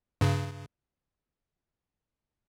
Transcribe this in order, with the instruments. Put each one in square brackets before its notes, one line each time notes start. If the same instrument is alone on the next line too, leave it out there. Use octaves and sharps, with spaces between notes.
[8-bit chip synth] G2 C#3